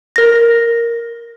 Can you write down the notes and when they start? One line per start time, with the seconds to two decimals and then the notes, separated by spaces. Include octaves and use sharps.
0.16 A#4 A#6